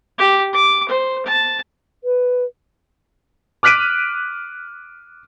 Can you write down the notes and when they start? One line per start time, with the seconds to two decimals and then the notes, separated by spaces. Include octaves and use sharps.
0.18 G4
0.53 D6
0.88 C5
1.25 A5
2.04 B4
3.63 D6 F6 F#6 B6 D7 D#7